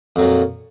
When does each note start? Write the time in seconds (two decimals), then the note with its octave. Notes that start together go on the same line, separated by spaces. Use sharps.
0.16 F2
0.19 F#3
0.22 A#2